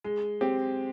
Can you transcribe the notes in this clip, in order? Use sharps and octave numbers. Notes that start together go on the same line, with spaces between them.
G#3
C4 G4